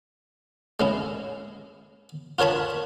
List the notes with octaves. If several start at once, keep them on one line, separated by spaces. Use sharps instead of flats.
G#3 C#4 E4
F4 A#4 C#5 A5 B5